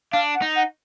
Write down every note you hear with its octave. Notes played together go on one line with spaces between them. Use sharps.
D4 F5
F#5
D#4
F#5